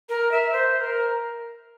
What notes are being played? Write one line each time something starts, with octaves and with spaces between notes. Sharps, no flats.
A#4
E5
C5
A#4